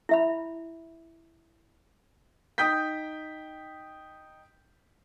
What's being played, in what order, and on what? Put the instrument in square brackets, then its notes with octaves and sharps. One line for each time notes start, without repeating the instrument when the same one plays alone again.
[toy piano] E4 E5 B5
[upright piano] D#4 G5 D#6 G6 B6